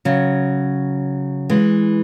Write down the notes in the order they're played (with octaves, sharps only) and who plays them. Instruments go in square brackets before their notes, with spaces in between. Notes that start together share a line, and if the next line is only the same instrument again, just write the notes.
[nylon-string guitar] C#3 F#3
E3 G#3